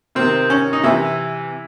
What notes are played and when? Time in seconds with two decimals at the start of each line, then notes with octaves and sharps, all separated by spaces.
0.15 C3 D#3 C4
0.50 C#4
0.73 D#4
0.83 C3 E3 E4